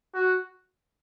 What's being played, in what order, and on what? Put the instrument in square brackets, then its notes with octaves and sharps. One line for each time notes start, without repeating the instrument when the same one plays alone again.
[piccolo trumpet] F#4